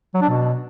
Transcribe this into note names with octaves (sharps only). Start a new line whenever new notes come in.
F#3
D4
B2